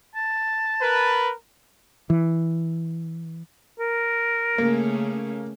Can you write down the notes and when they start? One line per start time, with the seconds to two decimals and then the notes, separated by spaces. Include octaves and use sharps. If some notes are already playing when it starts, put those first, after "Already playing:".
0.15 A5
0.81 A#4 B4
2.10 E3
3.80 A#4
4.58 C#3 A3 A#3 C#4